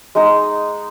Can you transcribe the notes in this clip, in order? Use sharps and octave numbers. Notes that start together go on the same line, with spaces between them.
G#3 D#4